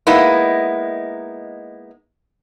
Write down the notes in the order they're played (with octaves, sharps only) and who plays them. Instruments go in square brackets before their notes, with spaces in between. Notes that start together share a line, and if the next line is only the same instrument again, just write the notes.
[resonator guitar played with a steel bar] G#3 A#3 B3 D#4 E4